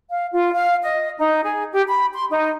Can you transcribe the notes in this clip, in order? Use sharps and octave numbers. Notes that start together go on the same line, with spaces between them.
F5
F4
F5
D#5
D#4
G#4
G4
B5
C6
D#4